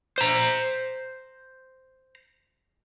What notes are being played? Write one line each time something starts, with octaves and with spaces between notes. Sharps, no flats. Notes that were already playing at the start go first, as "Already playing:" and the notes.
C5 A#5